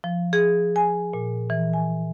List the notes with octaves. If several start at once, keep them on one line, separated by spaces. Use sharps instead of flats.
F3
G#4
G#5
A#2
E3
G#5